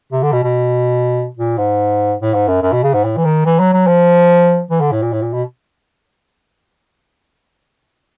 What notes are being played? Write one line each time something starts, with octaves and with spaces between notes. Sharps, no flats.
C3
D3
B2
B2
A#2
G#2
A2
G#2
F#2
F#2
B2
C#3
G#2
A2
E3
D#3
E3
F#3
F#3
F3
E3
D3
A2
A#2
A2
A#2
B2